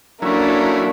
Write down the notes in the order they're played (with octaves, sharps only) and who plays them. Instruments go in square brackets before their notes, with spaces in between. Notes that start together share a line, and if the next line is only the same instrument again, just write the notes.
[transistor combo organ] F#3 C#4 E4 [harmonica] A3 A#5 [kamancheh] A#3 D4